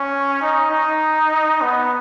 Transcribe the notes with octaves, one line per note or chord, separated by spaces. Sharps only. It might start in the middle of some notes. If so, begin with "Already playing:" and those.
Already playing: C#4
D#4
D#4
B3